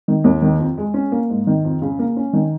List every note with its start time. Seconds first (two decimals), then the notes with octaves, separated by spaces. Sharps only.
0.08 D#3
0.24 D#2
0.42 D#3
0.59 F2
0.78 G#3
0.94 C#4
1.12 A#3
1.30 G#2
1.47 D#3
1.64 F2
1.82 C#3
1.99 A#3
2.17 C#4
2.33 D#3